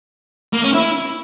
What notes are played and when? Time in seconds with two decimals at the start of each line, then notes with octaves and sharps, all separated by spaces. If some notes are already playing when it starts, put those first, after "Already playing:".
0.53 A#3
0.64 C#4
0.74 E4